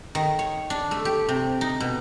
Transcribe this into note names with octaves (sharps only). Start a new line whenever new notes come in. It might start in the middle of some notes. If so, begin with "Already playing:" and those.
D#3
C#5
D4
A3
G4
C3
D#4
B2